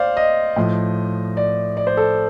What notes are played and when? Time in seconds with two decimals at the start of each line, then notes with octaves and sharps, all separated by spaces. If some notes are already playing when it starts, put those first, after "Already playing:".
Already playing: C5 D5 F5
0.17 D#5
0.56 A2 F3
1.37 D5
1.77 D5
1.87 C5
1.97 A4